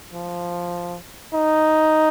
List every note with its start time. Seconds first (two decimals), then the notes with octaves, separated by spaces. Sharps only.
0.13 F3
1.34 D#4